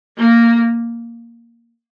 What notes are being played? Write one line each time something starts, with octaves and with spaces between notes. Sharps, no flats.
A#3